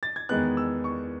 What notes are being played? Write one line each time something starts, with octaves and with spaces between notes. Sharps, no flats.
A6
G#6
E2 D#3 G#3 B3 F#6
E6
C#6